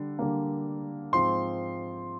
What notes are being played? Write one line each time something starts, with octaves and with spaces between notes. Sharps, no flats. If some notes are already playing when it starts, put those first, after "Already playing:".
Already playing: D3 G3
D3 G3 A#3
G#2 F3 C4 C6